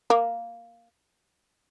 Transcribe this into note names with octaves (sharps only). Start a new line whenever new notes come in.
A#3